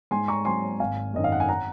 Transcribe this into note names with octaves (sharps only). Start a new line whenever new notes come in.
G#2 G#5 C6
A#5 C#6
F#3 C4 G#5 C6
G#1 F5 G#5
F#2 D#3 D#5
F5
F#5
G#5
F#5 A#5